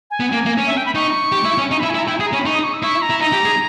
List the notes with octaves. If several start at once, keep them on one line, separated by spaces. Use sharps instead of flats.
G#5
B3
A#3
A#3
C#4
E5
G5
B5
D#4 C#6
G4
E4
C#4
D#4 C#6
E4 B5
G#5
E4
A#5
E4 G5
G#4 G#5
A#5
C#4
B5
D#4 C#6
D#6
C#6
E6
E4 C#6
A#5
E4
D#4 A#5
G4
G#4